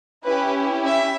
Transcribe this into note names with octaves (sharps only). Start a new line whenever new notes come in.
C#4 E4 G4 B4
E5